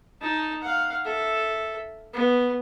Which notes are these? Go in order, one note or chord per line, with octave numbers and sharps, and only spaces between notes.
D#4 A5
F5 F#5
A4 E5
B3